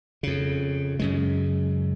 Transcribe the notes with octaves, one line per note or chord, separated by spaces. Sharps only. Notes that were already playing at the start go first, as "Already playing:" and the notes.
F2 C#3
F#2 C#3 G#3